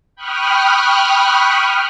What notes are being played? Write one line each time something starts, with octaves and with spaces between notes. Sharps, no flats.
G5 B5 C#6 D#6 F6 F#6